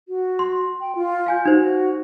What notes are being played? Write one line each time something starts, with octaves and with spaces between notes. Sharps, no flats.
F#4
C6
G5
F4
F5 G#5 G6
D#4 F#4 C5